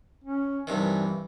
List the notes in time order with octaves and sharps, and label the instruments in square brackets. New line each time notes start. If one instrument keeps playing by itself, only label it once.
[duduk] C#4
[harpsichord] G2 C3 D#3 [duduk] E3